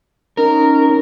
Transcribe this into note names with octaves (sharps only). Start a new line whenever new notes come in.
C#4 D#4 A#4